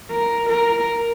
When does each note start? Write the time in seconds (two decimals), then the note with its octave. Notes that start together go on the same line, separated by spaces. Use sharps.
0.11 A#4
0.50 A#4